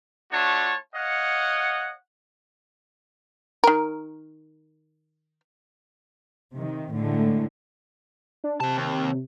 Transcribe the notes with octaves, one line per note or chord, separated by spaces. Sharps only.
A3 D4 F4 F#4 C#5 A5
C#5 D#5 F5 F#5
D#3 A#4
C3 D#3
A2 D3 G#3
D4
C3 C4 A5
D#2